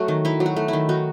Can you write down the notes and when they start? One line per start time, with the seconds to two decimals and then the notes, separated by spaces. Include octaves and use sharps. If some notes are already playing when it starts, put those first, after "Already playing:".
Already playing: F#3 A3 F#4
0.08 D#3
0.25 D#4 E4
0.40 F#3
0.46 F#4
0.56 A3
0.68 D#3 E4
0.89 D#4 F#4